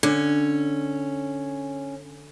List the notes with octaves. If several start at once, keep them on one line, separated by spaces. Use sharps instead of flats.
D3 C#4